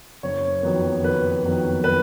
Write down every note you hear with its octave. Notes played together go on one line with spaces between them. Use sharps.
F#1 C#5
F2 D#3 F#3 B3
F#1 B4
F2 D#3 F#3 B3
B4